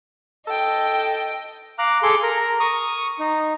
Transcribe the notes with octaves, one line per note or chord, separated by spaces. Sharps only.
A4 D#5 G5
F5 A#5 D6 F6 F#6
G#4 A4 C6 D6
A#4 A#5
C#6 D#6
D#4